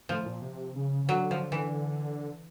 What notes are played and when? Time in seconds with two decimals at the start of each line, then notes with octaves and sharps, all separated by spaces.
0.09 A2 F3
0.26 A#2
0.42 C3
0.75 C#3
1.04 C#3
1.08 D3 F#3
1.31 F3
1.52 E3